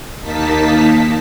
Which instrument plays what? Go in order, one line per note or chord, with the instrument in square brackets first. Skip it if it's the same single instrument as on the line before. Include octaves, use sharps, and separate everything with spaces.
[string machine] D#2 A#3 D#4 A5 B6